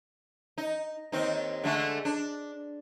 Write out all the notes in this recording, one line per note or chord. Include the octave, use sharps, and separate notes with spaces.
D#4
D#2 C4 D#4
D3 G#3 A3
D4